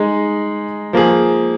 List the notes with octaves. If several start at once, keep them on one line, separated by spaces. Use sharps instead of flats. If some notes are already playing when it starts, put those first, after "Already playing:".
Already playing: G#3 D#4 G#4
F3 A#3 G#4